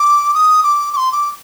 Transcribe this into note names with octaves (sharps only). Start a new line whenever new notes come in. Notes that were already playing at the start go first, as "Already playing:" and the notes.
Already playing: D6
D#6
D6
D6
C6
D6